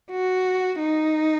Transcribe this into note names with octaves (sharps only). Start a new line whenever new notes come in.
F#4
D#4